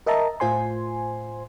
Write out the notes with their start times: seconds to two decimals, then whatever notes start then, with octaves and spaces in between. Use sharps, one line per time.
0.06 A#4 D#5 E5 A5 A#5
0.40 A2 F4 C5 G#5 C6